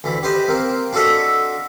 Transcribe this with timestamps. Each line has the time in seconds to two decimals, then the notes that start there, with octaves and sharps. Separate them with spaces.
0.04 D2 E3
0.23 G4 B4 C5 D#5
0.48 A#3 C4
0.93 D4 F4 F#4 A4 D#5 E5